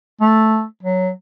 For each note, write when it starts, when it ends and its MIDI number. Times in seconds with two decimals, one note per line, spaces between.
0.21 0.64 57
0.83 1.10 54